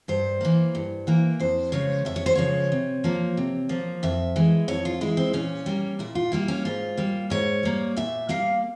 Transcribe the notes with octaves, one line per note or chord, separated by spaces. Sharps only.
G2 C5
E3 A#3
G2
E3 A#3
F2 C5
C#3 F3 G#3 C#5
F2 E5
C#5
C5
C#3 F3 G#3 C#5
C3
F3 A#3
C3
F3 A#3
F2 E5
E3 G#3
F2 C#5
F4
E3 G#3 E4
C4
A#2 C#4
G3 A#3
A#2 E4
F4
G3 A#3 E4
C#4
G#2 F4
G3 A#3
G#2 C#5
G3 A#3
A#2 E5
G3 A#3 F5